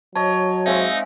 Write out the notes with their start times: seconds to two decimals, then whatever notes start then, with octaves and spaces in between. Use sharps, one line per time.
0.16 F#3 C#5 D#5 A5
0.66 G#3 C4 D#4 E5 F5 G#5